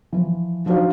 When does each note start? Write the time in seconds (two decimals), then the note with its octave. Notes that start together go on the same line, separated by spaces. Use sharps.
0.13 E3 F3
0.66 F3 D4 D#4 F#4 C5 F5